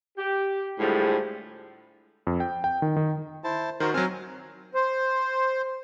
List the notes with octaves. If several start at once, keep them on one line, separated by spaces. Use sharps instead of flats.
G4
A2 D3 F3 G3 G#3
F2
G5
G5
D#3
D#3
E4 C5 A5
D#3 F#4 A#4 C5
F#3 C4 G#5 F6
C5